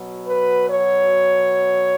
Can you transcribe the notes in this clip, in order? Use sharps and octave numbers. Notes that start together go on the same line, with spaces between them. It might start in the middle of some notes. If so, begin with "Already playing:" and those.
Already playing: B2 F#3
B4
C#5